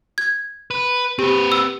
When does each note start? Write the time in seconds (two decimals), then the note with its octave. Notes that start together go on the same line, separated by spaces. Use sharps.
0.18 G#6
0.71 B4
1.19 C4 G4 B4
1.52 E6